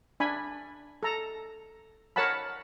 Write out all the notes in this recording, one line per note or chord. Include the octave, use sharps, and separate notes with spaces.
D4 G#5 B5
A4 A#5
A#4 C#5 F#5 A5 B5